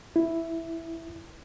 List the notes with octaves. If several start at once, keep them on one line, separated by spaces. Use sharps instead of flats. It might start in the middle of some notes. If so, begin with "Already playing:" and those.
E4